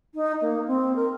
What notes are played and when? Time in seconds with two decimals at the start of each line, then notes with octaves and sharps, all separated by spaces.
0.14 D#4
0.41 A#3
0.67 C4
0.96 A#4